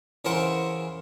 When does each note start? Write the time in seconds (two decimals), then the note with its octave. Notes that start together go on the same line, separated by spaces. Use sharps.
0.25 C#3 E3 A#4 C5 F#5